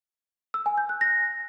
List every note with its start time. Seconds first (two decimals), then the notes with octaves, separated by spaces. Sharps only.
0.54 E6
0.66 G#5
0.78 G6
0.89 F#6
1.01 A#6